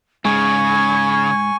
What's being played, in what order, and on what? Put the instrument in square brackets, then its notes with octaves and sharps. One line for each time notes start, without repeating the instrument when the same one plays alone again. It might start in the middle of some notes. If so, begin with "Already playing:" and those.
[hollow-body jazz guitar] G#2 [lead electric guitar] C#3 [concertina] G#5 C#6 [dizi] G#6